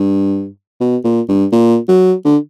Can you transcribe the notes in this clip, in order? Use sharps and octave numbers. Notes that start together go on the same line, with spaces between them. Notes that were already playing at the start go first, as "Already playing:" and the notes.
Already playing: G2
B2
A#2
G2
A#2
F#3
D3